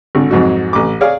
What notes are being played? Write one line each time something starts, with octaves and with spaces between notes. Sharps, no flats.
G#1 D3
F2 G#2 F#3 D#4 F#4
A1 D6
G#4 C#5 D5 F5